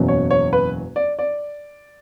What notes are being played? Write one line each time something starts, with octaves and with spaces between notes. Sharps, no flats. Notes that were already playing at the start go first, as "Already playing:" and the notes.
Already playing: F#1 E2 B2 F#3 C#4
C#5
C#5
B4
D5
D5